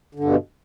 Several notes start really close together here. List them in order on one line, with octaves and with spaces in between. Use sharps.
D3 G2 B2